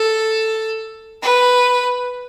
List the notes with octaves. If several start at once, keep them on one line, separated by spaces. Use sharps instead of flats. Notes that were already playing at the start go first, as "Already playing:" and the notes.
Already playing: A4
B4